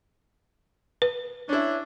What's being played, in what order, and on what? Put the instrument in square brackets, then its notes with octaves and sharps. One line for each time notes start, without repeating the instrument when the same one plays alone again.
[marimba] B4
[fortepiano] C#4 E4 [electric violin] D4